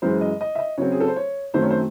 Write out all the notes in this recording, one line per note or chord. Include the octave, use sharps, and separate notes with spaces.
F#2 E3 G#3 C5
D#5
D#5
E5
D#5
C#3 F#3 C4 C#5
G#4
A4
C5
C#5
F#2 D#3 F#3 A3 C4 C5
C#5
C5